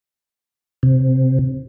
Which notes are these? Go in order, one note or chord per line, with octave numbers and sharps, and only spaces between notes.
C3